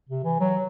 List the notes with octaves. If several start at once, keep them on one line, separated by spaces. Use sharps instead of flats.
C3
E3
F#3